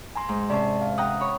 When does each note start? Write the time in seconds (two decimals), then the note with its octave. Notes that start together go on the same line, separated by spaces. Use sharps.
0.16 G#5 A#5 C6
0.29 G#2
0.50 C3 C#4 C5 D5 A5
0.82 F5
0.98 F#5 G5 A#5 D#6
1.20 C#5 B5